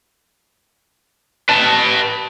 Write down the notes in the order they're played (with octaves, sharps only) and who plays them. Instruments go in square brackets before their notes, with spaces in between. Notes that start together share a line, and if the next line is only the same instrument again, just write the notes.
[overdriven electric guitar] B4 A5